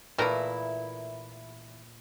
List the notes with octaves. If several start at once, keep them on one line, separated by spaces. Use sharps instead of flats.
A#2 E3 A3 E4 A#4 A#5